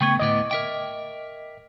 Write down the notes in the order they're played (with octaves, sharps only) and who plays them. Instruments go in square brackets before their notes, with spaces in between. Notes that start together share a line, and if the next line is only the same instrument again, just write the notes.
[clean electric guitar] C#3 A3 B3 [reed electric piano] G5 C#6 G#6
[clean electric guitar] D2 A2 B3 [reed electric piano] D#5 D6
[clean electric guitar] A#4 E5 G5